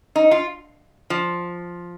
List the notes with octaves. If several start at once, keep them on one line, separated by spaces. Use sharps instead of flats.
D#4
F4
F3